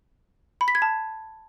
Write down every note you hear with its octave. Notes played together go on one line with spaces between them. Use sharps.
B5
B6
G#6
A5